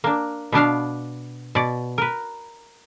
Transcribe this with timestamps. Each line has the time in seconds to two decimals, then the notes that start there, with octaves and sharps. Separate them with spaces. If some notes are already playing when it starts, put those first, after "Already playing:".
0.04 A#3 D4
0.52 B2 B3 D4 F5
1.55 B2 D5
1.98 A#4 B4